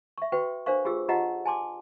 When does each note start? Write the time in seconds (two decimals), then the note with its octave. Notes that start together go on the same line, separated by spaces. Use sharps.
0.18 E5 C#6
0.32 F#4 B4 G5 C#6
0.66 D4 A#4 C5 F5 C#6
0.85 F4 G4 G#4 E6
1.09 D#4 F4 G4 D#5 F#5 A#5
1.46 G#5 A5 C6 D6